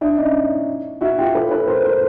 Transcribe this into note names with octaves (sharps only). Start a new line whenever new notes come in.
D4 E4
C#4 D#4
E4 F#4
F4 G4
A4 B4
A4 B4
A#4 C5
A#4 C5